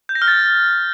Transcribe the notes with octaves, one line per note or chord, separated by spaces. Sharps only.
G6
A#6
F6
A6